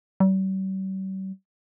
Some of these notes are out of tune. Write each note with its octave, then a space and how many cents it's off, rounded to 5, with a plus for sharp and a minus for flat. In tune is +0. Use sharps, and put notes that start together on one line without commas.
G3 -45